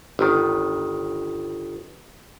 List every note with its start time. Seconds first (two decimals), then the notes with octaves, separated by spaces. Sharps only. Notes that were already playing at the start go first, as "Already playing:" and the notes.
0.19 G1 D#3